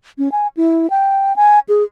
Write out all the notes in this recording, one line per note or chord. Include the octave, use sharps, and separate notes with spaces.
C#4
G#5
E4
G5
G#5
G#4